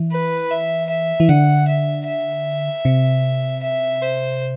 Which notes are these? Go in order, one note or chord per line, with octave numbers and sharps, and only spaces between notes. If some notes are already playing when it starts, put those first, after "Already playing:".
Already playing: E3
B4
E5
E5
E3
D3 F#5
E5
E5
C3
E5
C5